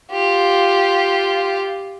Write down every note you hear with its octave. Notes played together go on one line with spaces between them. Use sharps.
F4 G4